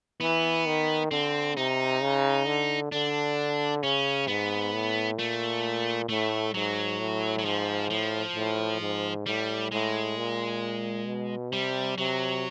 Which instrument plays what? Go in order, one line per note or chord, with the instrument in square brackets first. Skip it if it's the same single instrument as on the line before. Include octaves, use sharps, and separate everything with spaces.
[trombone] E3 [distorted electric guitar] B3
[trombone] D#3
[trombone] D3 [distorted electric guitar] C4
[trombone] C3 [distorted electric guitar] D#4
[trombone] C#3
D3
[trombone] D3 [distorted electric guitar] D4
[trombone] C#3 [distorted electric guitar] C#4
[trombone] G#2 [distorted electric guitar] B3
[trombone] A2
[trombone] A#2 [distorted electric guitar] A3
[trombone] A2 [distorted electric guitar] A3
[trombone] G#2 [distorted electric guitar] F#3
[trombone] A2
[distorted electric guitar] F#3
[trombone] G#2 [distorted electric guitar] F3
[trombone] A2 [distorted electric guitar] F3
[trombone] A2
G#2
[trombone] A2 [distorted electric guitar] G3
[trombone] A2 [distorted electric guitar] G#3
[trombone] A#2
B2
[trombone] C3 [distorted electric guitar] G3
[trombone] C3 [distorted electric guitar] F#3